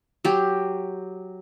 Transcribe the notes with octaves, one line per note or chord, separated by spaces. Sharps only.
F#3 G4